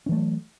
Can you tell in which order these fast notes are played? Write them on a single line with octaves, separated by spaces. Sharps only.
C#4 E3 A3 F#3